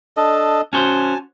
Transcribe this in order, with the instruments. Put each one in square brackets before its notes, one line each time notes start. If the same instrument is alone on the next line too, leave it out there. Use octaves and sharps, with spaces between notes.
[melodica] D4 A4 D#5
[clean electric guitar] C#4 F#4 C5 [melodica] G#5 A5